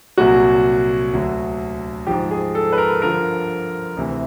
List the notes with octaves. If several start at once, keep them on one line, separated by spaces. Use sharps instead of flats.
C2 A#2 F#3 F#4
D2 D3 F#3
G#2 F3 G4
G#4
A4
B4
A#4
G2 D3 F3 A#4
D2 C3 E3